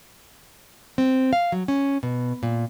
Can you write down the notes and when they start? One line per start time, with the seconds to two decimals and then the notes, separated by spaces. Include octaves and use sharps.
0.98 C4
1.33 F5
1.52 F#3
1.68 C#4
2.03 B2
2.43 A#2